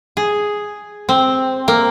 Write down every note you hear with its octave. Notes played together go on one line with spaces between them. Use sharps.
G#4
C4
A#3